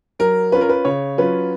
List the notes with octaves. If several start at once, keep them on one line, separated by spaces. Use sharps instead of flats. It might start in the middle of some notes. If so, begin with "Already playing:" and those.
F#3 A#4
C#4 F4 B4
A#4
B4
C#3 C#5
F#3 C#4 F4 B4